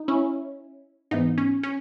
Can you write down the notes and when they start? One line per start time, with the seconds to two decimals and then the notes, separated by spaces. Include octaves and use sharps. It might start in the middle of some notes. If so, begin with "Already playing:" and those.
Already playing: D#4
0.08 C#4 E4
1.11 G#2 E3 B3 D#4
1.38 C#4
1.63 C#4